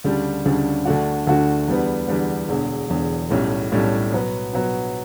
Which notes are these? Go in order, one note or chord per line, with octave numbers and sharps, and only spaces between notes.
D2 C#3 G3 D4
D2 C#3 G3 D4
D2 D3 A3 D4 F#4
D2 D3 A3 D4 F#4
E2 D3 G3 B3
E2 D3 G3 B3
E1 E2 D3
E1 E2 D3
B1 A2 G3 C#4
B1 A2 G3 C#4
B2 F#3 B3
B2 F#3 B3